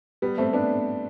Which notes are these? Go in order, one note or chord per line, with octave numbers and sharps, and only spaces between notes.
G3 B3
A3 C4
B3 D4